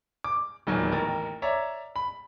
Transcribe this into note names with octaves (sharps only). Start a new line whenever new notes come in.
D6
E1 A#2 D#3 F#3 G#5
A1 D#2 A#4 A6
C#5 D5 E5 A#5
B5